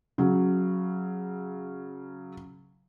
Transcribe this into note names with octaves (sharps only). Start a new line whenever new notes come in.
C#3 F#3